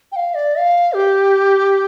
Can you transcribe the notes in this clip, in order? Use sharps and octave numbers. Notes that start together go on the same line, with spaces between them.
G5
F5
D5
F5
G4